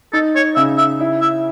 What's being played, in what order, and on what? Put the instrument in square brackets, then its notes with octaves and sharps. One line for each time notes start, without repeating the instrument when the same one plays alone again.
[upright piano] D#4 [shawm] A4
[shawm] C#5
[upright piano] C#3 [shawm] E5
[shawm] E5
[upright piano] E4
[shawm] E5